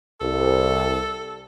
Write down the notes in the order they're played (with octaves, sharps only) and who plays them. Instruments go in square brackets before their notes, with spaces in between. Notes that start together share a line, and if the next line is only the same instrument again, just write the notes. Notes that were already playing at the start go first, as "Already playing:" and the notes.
[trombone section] C2 [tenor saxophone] A4